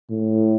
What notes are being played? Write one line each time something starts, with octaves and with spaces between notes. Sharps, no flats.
A2